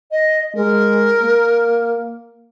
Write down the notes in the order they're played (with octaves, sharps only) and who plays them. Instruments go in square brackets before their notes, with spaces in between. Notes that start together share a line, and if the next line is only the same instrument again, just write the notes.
[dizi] D#5
[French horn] G#3 [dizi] A#4
[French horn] A#3